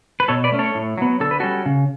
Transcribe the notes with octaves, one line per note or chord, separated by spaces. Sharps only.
B4
B2 A4 C#5
B4 D5
A3 C#4
A4 C#5
A2
F#3 B3
D3 A4
B4
G3 C#4 F#4 A4
C#3